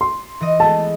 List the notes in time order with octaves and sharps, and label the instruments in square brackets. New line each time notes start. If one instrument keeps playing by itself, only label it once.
[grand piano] C6
[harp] E3 D#5
[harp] G#3 A3 B3 [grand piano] A5